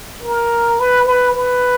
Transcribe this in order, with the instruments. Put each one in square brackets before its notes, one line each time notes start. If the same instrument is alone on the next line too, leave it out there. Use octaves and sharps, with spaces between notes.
[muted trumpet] A#4
B4
B4
B4